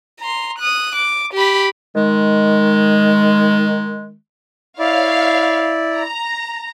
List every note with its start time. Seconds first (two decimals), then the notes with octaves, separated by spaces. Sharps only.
0.20 A#5 C6
0.59 D#6 F#6
0.95 D6
1.33 G4 B5
1.95 D#3 G#3
4.79 E4 C#5 D5 F5
5.96 A#5